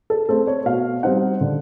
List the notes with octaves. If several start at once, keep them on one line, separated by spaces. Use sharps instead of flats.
A4
A3 C4 A4
C#5
B2 F5
G3 C4 D#4 F#5
D3